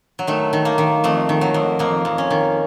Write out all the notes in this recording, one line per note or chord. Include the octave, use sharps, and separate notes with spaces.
F#3
D#3 A3
D#3
A#3
D#3
F2 A3
D#3
F#3
F2
F2 A#3
F2
C#4
D#3